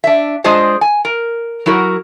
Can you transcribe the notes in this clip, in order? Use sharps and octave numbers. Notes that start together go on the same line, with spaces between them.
D4 E5
G#3 D4 F4 G#4 C5 D#5
G#5
A#4
F#3 E4 F#4 A#4